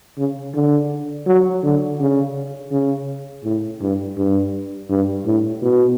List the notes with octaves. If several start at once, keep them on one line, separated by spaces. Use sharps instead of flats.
C#3
D3
F#3
D3
C#3
C#3
A2
G2
G2
G2
A2
B2